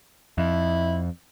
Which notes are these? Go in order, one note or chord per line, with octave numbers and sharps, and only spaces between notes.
F2 E4